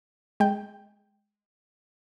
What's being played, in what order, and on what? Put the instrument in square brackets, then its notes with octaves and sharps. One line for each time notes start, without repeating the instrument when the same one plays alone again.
[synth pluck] G#3 G5